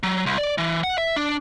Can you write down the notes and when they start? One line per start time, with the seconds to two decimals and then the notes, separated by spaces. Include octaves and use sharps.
0.03 F#3
0.26 C2
0.38 D5
0.58 E3
0.84 F#5
0.98 E5
1.16 D4